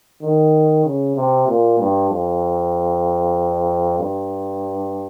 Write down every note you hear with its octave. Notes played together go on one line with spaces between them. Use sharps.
D#3
C#3
C3
A#2
G2
F2
G2